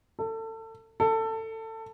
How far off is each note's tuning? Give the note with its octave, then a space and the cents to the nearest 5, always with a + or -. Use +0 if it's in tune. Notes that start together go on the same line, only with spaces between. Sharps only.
A4 +25
A4 +20